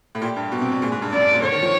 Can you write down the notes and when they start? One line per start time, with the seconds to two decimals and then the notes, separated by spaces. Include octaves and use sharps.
0.15 A2
0.21 A#2 G4
0.36 G2
0.52 B2
0.62 C3
0.72 B2
0.81 A#2 G#4
0.92 G#2
1.02 G2
1.12 F#2 D5
1.22 G2
1.32 A#2
1.42 D3 C#5
1.52 D#3
1.63 F3